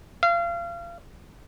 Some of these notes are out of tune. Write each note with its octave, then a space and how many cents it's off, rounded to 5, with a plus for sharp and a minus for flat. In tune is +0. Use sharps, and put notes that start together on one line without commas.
F5 -30